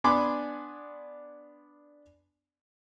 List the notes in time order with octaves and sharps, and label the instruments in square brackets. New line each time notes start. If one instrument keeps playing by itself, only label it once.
[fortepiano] B3 D4 G#5 B5 C6 D6